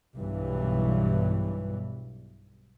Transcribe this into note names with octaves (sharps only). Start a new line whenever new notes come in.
B1 G2 E3